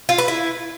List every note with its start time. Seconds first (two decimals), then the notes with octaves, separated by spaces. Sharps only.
0.09 F4
0.18 B4
0.28 E4